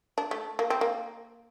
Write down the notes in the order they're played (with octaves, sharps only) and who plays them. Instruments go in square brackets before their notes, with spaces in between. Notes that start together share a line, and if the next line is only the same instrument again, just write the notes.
[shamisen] D4
A3
A#3
C4
A#3